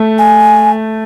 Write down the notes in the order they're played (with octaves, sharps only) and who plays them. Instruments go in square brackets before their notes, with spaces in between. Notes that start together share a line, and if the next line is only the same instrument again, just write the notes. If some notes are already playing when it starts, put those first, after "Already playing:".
Already playing: [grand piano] A3
[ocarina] G#5